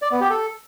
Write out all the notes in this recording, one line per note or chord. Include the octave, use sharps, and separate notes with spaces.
D5
B3
G4
A4